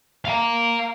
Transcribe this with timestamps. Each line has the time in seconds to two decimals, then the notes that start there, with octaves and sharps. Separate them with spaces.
0.25 F5 A#5